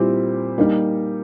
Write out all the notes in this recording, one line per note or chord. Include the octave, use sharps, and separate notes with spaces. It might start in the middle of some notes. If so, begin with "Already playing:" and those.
Already playing: A#2 G3 C4 E4 G4
G3 A#3 D#4